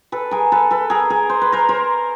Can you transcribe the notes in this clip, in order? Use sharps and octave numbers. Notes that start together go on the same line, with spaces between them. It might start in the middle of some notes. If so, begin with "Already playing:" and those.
A4 B4
G#4 A#4
A4 B4
A4 B4
G#4 A#4
G#4 A#4
C5
B4
A#4 C5
A#4 C5